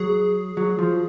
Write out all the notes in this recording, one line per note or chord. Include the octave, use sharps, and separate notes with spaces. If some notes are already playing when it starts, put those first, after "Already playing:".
Already playing: F#3 G#4
F#3
F3